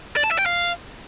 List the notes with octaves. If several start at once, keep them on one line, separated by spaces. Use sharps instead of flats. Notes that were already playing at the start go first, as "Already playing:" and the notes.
D5
A5
E5
G5
F5